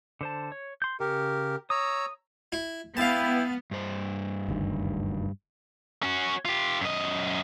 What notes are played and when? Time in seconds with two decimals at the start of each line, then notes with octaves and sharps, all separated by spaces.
0.21 D3 C5 A5
0.52 C#5
0.82 C6 G6
1.00 C#3 G4 A#4
1.70 C#5 A#5 D#6 E6
2.52 E4
2.97 B3 E4 F5 G5 A5
3.71 G2 C5
4.48 F#1 D2 D#3
6.03 C#4 F#4
6.45 F4 G4
6.81 F#2 D#5